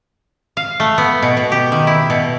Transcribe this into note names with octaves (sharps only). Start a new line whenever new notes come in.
F5
A3
B3
B2
B2
G4
D#3
E4
B2